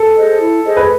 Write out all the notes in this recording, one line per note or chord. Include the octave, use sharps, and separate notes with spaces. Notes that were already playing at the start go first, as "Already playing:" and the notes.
Already playing: A4
G#4 C5 D#5
E4
G#4 C5 D#5
B4